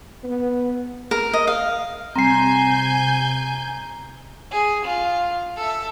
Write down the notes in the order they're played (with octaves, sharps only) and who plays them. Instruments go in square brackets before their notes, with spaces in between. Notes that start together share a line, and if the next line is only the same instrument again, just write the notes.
[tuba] B3
[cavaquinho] A#4
D#5
F5
[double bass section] C3 [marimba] G3 C4 [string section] G#5 G6 [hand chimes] A#5 C7
[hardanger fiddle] G#4
F4
A4 E5